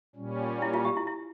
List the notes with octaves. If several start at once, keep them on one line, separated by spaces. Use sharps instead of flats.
A#2 G3 C#4
E4
F4
G4
E4
E4